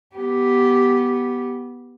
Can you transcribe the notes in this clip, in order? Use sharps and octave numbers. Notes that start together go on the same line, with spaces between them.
B3 G4